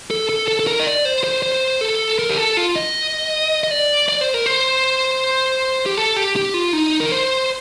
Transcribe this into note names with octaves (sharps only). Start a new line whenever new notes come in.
A4
A4
A4
A4
A#4
D#5
D5
C5
C5
C5
A4
A#4
G4
A4
F4
D#5
D#5
D5
D5
C5
A#4
C5
G4
A4
G4
G4
F4
D#4
A#4
C5